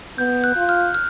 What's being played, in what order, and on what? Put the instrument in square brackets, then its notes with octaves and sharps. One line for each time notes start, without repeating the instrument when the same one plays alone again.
[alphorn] B3 [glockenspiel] G6
[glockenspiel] F#6
[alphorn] F4
[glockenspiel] F6
F6